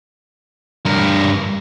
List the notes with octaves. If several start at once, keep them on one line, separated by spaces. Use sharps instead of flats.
G2 A#4